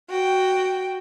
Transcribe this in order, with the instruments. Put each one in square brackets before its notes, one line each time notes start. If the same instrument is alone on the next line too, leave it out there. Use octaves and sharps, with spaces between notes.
[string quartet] F#4 G5